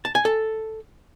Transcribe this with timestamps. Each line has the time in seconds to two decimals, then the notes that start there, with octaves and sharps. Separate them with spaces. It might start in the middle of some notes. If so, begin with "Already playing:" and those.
0.05 A5
0.15 G#5
0.25 A4